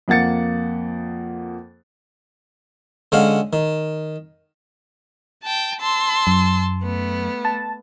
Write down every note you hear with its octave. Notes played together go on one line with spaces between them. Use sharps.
F2 A#3 F#5 A6 C#7
D3 G#3 C#4 F5 F#5
D#3
G5 A5
A5 C6 E6
F#2
A3 B3
A5